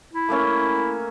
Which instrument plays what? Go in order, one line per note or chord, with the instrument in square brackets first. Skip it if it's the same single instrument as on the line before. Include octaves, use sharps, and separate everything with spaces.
[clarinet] E4
[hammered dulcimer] A3 A#3 C#4